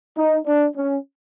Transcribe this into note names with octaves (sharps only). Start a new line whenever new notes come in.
D#4
D4
C#4